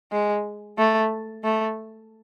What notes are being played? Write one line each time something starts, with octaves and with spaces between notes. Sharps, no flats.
G#3
A3
A3